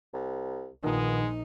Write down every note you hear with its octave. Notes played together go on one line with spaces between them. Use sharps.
C2
A#1 A#2 D#3 G#3 B3 D#4